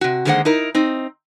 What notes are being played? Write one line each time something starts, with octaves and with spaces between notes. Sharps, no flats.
C3 F#4
D3 D#3 G#3 A#3 C5 F#5
D#4 E4 A#4
C4 D#4